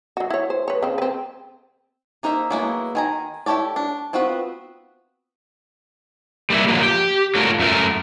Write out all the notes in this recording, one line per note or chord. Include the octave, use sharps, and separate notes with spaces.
F#3 F#4
E4 C#5
C5
B4 C#5
C#3 C4
C4 B4
A#3 D#4 A#4 C5 E5
F#3 G#3 A#3 B3 E4
D#3 G#5 A#5
E4 G4 A4 C#5 D5
D4
B3 C4 F4 F#4 B4
G3 A#3 D#4 E4
D3 F3 F#3 A#3
G4
F#3 A3 F4 A#4
F#2 A3 A#4